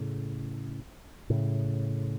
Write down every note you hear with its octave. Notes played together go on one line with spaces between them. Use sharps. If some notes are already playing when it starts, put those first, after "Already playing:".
Already playing: A2 C#3
A2 C#3